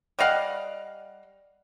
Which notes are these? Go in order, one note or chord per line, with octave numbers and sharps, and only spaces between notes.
G3 D#5 F5 F#5